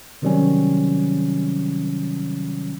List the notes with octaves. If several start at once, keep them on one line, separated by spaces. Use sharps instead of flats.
C3 D#3 F#3 G3 C4 C#4